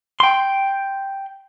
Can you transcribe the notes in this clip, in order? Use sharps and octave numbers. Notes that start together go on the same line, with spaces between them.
G5 C6